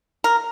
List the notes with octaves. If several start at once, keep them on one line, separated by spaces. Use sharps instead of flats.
A#4